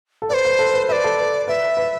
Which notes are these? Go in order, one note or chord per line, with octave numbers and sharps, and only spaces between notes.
A4
B4 C5 D5
B4
A4
B4
B4 D5 E5
A4
B4
B4 E5
B4